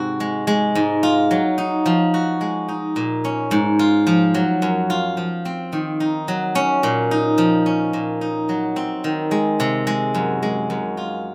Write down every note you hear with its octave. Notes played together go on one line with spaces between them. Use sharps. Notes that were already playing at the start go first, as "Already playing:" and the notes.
Already playing: G#2 C3 C4 F#4
G#3
G#3
G#2
F4
F#3
D#4
F3
F#4
G#3
D#4
A#2
C#4
G#2
F4
F3
F#3
F#2
F4
F3
C4
D#3
D#4
F#3
C#4
A#2
D#4
F3
C#4
A#2
D#4
F#3
C4
D#3
G#3
C3
G#3
F#2
G#3
F#2
F4